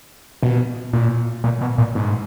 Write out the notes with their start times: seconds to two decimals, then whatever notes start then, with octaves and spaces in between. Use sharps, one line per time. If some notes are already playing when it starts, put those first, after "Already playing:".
0.43 B2
0.93 A#2
1.44 A#2
1.61 B2
1.78 A#2
1.95 G#2